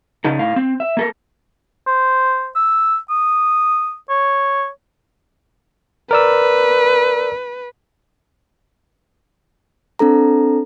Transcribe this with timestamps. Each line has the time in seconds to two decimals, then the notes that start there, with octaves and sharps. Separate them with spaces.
0.24 C#3 D#4 A4
0.39 A2 F5
0.56 C4
0.80 E5
0.97 A#3 A4 A#4
1.87 C5
2.56 E6
3.10 D#6
4.10 C#5
6.11 A#4 B4 D5 E6
9.99 C4 D4 A4 A#5